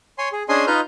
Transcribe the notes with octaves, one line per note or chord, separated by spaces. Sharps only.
C#5 G#5 C6
G#4
C#4 D4 G#4 D#5 G#5 C6
D#4 F4 B4 D#5 F6 G6